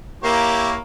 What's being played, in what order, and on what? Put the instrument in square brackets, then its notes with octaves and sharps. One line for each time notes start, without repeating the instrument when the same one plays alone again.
[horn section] A#3 [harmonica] E4 G4 C#5